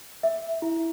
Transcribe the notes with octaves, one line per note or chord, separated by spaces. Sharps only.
E5
E4